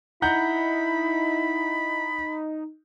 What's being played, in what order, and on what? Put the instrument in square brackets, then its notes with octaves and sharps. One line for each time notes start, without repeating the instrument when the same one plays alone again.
[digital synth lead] D#4 [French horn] E4 [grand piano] F#5 A#5 G6 [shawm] B5